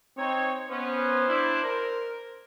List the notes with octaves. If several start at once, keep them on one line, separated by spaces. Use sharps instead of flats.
C4 D#4 C#5
B3 C#4 C5
D4 E4
A#4